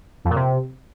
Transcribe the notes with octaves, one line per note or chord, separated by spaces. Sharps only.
F2
A#2
C3